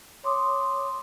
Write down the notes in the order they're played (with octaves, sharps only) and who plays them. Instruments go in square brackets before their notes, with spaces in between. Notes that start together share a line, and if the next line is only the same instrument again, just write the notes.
[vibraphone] C#5 C6 D6 D#6